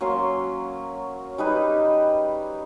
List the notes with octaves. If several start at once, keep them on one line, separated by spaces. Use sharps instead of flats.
F#3 A#3 C#4 C6
G3 D#4 G#4 B4